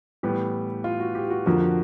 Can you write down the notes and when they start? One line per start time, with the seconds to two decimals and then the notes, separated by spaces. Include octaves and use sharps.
0.23 A2 E3 G3 B3 G4
0.84 F4
1.00 F#4
1.15 G4
1.30 F#4
1.46 F2 D3 F3 A#3 F#4
1.61 F#4